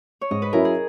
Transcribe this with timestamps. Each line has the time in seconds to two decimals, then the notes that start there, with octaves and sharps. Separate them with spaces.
0.21 C#5
0.31 G#2 D#5
0.42 B4
0.53 F#3 C#4 E4 A#4
0.65 G#4